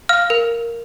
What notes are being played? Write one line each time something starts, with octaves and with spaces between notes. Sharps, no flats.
F5 F6
A#4